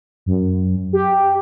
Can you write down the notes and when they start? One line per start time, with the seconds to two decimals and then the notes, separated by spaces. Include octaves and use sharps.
0.26 F#2
0.93 G4